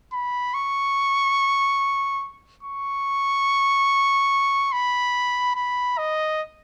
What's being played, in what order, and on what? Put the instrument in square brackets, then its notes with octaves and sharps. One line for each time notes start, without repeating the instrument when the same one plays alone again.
[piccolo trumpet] B5
C#6
C#6
B5
B5
D#5